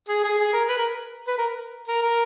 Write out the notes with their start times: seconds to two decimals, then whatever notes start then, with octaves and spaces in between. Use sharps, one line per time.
0.09 G#4
0.24 G#4
0.39 G#4
0.53 A#4
0.69 B4
0.78 A#4
1.28 B4
1.38 A#4
1.88 A#4
2.02 A#4